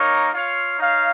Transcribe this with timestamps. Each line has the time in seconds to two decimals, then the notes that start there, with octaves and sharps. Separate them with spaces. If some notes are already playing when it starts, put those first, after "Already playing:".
Already playing: A#3 D#4 A#4 C#5
0.32 F4 C#5 F5
0.79 D#4 C#5 F5